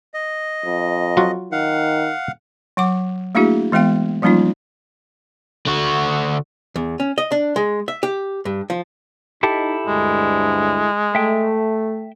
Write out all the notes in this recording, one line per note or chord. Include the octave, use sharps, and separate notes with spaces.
D#5
F2
F#3 F4 F#4
D#3 F5 F#5
F#3 F#5 D6
A3 A#3 D4 E4 F#4 G#4
E3 G#3 B3 F5 G5
F3 G3 A#3 C#4 D#4 F4
D3 F#4
E2
C#4
D#5
D4
G#3
E5
G4
G2
F3
D#4 E4 G4 A4
D2 G2 G#3
A3 E5 G5